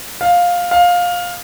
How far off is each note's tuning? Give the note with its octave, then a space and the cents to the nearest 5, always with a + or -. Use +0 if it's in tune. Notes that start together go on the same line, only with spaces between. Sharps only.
F5 +10
F5 +15